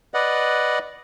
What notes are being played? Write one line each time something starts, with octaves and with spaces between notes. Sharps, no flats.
B4 D5 D#5 F#5